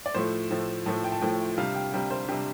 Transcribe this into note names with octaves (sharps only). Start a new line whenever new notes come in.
D5
A2 F3 A3 C5
A2 F3 A3
A2 F3 A3 A5
G5
A5
A2 F3 A3 G5
C3 G3 D4 F5
G5
C3 G3 D4 G5
C5
C3 G3 D4 G4